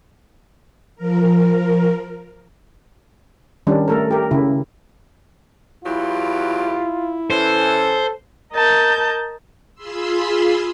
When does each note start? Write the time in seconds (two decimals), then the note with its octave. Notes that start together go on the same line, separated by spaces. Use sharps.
0.96 F3 A#4
3.67 D#3 G3 C#4 D4
3.88 A3 A4 A#4
4.11 G4 A#4
4.31 C#3 E4
5.84 E2 F#3 E4 F4 G4
7.30 E3 C#4 A4 C5
8.53 A#4 D#5 A5 G6
9.74 F4 G#4 B5 C6 E6